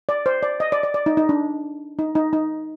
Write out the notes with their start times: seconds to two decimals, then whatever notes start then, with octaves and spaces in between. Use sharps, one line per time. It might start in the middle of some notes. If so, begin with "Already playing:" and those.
0.09 D5
0.26 C5
0.43 D5
0.60 D#5
0.72 D5
0.83 D5
0.94 D5
1.06 D#4
1.17 D#4
1.29 D4
1.99 D#4
2.15 D#4
2.33 D#4